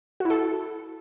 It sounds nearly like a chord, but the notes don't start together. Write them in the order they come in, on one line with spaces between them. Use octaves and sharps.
F#4 E4 A4